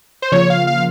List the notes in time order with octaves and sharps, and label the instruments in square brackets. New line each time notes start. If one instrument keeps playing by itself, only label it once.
[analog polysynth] C5
[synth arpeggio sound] C#3 F3 A#3 F4 [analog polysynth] C#5
[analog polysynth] F5
F5